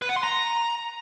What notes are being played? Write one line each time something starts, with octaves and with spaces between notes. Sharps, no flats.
B4
F#5
C6
A#5